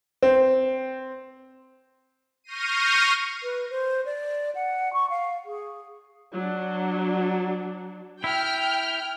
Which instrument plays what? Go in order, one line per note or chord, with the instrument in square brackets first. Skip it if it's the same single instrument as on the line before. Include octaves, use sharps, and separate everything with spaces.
[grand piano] C4
[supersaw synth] C#6 F6 G6 A#6 C7 D#7
[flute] B4
C5
D5
F#5
C#6
F5
G#4
[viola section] F#3 D4
[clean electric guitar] E4 [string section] G5 F6